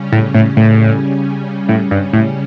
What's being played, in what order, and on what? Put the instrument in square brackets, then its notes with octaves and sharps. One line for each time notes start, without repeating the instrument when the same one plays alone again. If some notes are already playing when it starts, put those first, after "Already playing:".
Already playing: [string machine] C#3 G3 C#4
[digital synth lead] A2
A2
A2
A2
G2
A2